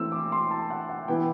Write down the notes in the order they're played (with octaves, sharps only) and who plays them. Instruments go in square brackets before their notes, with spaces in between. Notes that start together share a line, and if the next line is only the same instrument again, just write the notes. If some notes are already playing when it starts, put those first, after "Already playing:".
Already playing: [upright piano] E3 A3 C4 E4 E6
D6
C6
A5
F#5
F#5
E3 B3 E4 G5